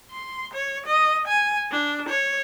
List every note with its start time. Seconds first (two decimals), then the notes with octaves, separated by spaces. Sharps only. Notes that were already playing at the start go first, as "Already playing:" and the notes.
0.11 C6
0.54 C#5
0.86 D#5
1.28 G#5
1.72 D4
2.09 C#5